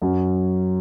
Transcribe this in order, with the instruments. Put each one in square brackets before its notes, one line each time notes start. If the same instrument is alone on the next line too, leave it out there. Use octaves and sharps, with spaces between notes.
[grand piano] F#2 F#3 C#4